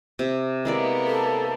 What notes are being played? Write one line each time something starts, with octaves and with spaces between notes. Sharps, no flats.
C3
G#3 A#3 B3 E4 D5
A4